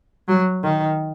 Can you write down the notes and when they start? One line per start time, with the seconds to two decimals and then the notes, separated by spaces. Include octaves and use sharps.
0.28 F#3
0.63 D#3